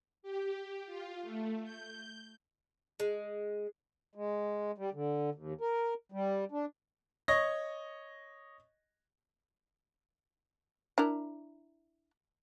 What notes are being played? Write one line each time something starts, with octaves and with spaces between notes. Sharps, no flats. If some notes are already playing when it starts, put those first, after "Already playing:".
G4
F4
A3
G6
G#3
G#3
G3
D3
D#2
A#4
G3
D4
C#5 D#5 C#6 A#6
D4 E4 A#4